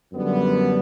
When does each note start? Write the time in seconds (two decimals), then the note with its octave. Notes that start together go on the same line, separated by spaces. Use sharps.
0.12 F#2 D3 G3 B3